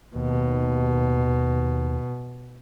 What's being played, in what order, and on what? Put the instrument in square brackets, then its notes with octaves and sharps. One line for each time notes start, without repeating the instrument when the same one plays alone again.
[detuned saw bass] D#2 [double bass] B2